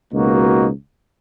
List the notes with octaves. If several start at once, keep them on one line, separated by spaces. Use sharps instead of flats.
C#2 B2 A#3 D#4 F#4